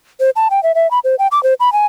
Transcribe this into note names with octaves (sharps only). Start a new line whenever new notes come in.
C5
A5
G5
E5
E5
B5
C5
G5
D6
C5
B5
G#5